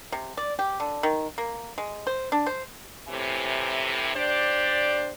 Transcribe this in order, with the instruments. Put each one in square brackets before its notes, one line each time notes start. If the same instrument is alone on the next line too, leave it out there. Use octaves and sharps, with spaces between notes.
[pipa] C3
D5
G4
D3
D#3
A#3
G#3
C5
D4
C5
[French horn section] A2 C3 E3
D4 G4 C5 D5